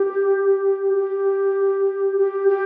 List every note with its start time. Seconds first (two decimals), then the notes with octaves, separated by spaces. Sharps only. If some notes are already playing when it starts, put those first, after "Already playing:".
Already playing: G4
0.93 G4
2.16 G4
2.48 G4